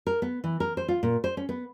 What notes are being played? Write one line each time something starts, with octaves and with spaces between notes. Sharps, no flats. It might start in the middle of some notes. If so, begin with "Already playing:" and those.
A#4
B3
E3
A#4
C5
F4
A#2
C5
C#4
B3